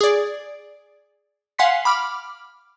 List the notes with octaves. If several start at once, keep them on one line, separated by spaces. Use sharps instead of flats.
G#4 D5
F5 F#5 G#5 C6 B6 C7
B5 D6 F6